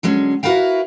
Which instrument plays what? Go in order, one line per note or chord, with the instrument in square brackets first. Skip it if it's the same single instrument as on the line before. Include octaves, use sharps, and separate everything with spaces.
[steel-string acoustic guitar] D3 F#3 G#3 C#4
E4 F#4 A#4 B4 F5 G5